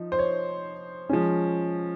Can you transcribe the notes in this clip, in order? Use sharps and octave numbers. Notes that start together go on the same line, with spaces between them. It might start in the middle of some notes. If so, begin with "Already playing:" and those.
Already playing: F3 D#4
C5
C#5
F3 G#3 C#4